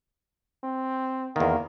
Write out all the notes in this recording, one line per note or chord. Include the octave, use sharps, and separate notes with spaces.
C4
E2 D#3 A#3